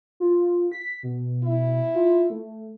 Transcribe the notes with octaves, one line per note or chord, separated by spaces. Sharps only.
F4
B6
B2
E4
F4
A3